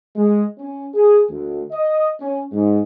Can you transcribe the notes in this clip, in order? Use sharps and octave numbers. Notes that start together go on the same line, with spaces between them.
G#3
C#4
G#4
D2
D#5
C#4
G#2